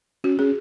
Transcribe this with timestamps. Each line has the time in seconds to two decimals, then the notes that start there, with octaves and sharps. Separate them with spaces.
0.24 C#4 F#4
0.39 C#4 G#4